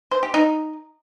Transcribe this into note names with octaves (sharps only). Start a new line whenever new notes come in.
C5
G4
D#4